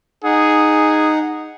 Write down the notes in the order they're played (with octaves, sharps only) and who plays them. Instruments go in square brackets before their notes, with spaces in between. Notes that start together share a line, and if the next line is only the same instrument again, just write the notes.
[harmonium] D#4 F#5 [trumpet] G#4